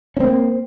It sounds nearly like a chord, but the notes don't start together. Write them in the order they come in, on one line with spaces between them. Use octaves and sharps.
C#4 C4 A#3